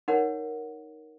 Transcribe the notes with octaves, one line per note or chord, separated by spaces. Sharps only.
D#4 A#4 C#5 F#5